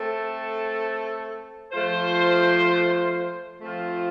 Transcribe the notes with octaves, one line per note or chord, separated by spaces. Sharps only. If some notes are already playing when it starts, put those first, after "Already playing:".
Already playing: A3 C4 A4
F3 A3 F4 C5
F3 A3 C4 F4